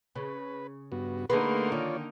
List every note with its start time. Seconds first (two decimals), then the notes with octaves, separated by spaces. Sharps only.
0.16 C#3 B4
0.92 G2 B3 F#4
1.30 D3 A3 A#3 D#4 G#4 B4 F#5 C6
1.72 D#3 F4 C#5 D5